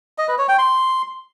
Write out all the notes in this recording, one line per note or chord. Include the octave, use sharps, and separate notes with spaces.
D#5
B4
C#5
G5
C6